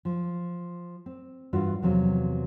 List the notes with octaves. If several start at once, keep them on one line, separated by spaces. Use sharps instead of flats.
F3
C4
G2 E3 F4 F#4 B4 E5
E2 C3 F3 F#3